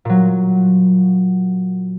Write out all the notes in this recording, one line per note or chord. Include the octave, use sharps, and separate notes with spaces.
A#2 F#3